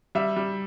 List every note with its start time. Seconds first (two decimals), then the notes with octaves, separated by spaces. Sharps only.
0.15 G3 E5
0.37 G3